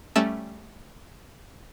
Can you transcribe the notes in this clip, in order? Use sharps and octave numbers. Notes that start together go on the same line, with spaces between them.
G3 A3 C#4 E5 A5 E7